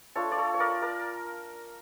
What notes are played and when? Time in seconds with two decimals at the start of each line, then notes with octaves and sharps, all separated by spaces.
0.15 A3 D4 F4 A4 C#5
0.31 D5
0.38 A4 C#5
0.54 C#5
0.60 A#4 D5
0.82 A#4 D5